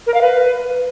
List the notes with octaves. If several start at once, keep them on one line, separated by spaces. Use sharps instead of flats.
A#4
F5
B4